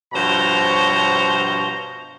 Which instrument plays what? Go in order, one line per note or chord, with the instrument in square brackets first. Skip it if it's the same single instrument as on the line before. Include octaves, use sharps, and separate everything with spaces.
[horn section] G2 B2 F3 C5 C#5 A#5